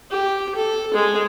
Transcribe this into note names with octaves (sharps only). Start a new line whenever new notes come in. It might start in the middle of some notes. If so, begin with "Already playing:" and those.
G4
A4
G#3